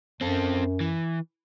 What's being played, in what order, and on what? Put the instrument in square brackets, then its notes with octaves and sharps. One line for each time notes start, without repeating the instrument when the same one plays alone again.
[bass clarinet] F#2 [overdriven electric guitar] C4 A4
[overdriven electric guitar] E3